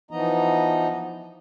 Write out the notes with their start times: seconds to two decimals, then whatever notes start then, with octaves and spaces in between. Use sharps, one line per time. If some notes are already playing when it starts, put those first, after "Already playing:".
0.11 E3 F3 B3 D#4 D#5 A#5